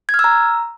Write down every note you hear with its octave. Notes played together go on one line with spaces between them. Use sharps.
G#6
F6
E6
A#5